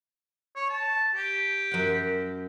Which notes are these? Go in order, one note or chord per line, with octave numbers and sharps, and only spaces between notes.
C#5
A5
G4
F#2 F#5